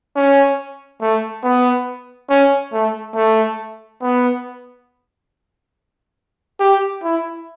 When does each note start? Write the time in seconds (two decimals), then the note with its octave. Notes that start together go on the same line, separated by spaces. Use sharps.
0.15 C#4
1.01 A3
1.43 B3
2.29 C#4
2.73 A3
3.15 A3
4.01 B3
6.60 G4
7.03 E4